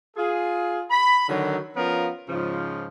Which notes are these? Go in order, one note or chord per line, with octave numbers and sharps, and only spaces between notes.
F4 G#4
B5
D3 D#3 F#3
F3 B3 C#4 F4 A#4
G#2 C#3 F3